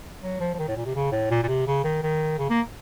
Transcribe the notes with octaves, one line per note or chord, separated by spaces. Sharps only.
F#3
F3
F3
D#3
A2
A#2
C3
C#3
A2
A#2
A#2
C3
C#3
D#3
D#3
C#3
A#3